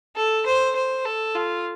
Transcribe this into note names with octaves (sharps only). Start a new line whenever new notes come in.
A4
C5
C5
A4
F4